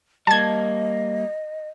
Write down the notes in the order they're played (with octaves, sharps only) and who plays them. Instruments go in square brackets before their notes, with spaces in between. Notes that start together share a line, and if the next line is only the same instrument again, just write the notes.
[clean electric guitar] G3 A#3 [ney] D#5 [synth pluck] A5 G#6